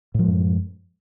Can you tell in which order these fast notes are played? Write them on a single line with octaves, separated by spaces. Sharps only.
A2 F3 G#3 F#2